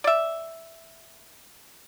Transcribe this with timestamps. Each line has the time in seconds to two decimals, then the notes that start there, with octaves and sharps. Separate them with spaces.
0.04 D5 E5